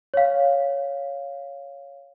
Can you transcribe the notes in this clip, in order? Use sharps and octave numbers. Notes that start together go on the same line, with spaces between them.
C#5 F5